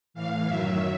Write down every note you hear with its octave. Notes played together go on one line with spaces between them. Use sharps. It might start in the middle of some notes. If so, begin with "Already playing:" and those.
A2 E3 F5
F#2 D#3 F#3 E5